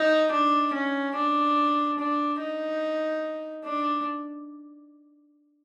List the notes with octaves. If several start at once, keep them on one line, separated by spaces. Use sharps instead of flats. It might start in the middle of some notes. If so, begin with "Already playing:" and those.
Already playing: D#4
D4
C#4
D4
D4
D#4
D4